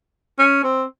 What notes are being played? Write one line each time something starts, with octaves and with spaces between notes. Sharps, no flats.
C#4
C4